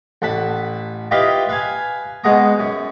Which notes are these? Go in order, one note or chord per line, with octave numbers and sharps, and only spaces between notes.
A1 F#5 A5 B5
E4 F4 G4 B4 D#5 F5
B4 F5 G#5
B2 G#3 B3 F#5 A#5 D#6
F#2